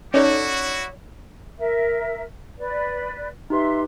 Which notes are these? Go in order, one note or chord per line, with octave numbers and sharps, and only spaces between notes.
C#4 D#4 E4 F#4 A4 C#5 D5 D6
A#4 E5
B4 D5
D#4 G4 B4 E5 C6